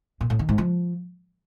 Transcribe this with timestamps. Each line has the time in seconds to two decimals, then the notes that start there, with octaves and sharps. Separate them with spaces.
0.21 A#2
0.30 A2
0.39 D#3
0.49 G#2
0.58 F3